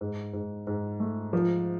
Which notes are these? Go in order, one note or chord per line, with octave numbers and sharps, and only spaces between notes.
G#2
G#2
G#2
A3
F3